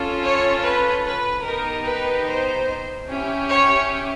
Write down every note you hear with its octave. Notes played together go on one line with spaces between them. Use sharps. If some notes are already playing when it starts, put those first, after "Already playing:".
Already playing: C#4 F4 A4
C#5
B4
B4
B3 D#4 G4 A#4
B4
C5
C#4 E4 G4
C#5